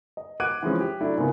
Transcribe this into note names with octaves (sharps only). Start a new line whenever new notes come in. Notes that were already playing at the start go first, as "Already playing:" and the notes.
D#5
F#5 D6 F#6 G#6 D7 D#7
E3 F3 G#3 C#4
G4
F#3 A3 D4 E4
G#2 C#3 A#3 B3 F4